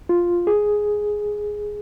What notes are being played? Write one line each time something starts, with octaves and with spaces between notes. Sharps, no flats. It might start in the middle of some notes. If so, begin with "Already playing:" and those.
F4
G#4